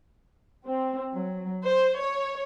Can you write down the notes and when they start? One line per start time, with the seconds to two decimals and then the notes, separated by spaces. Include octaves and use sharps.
0.66 C4
1.13 F#3
1.63 C5
1.98 C#5